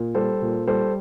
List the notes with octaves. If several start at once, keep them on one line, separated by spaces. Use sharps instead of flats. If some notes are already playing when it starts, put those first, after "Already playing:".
Already playing: A#2
G3 A4 C5
A#2
G3 A4 C5